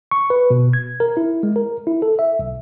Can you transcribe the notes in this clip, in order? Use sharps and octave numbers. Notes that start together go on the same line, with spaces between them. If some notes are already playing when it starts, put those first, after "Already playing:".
C#6
B4
B2
G#6
A#4
E4
G#3
A#4
E4
A4
E5
B1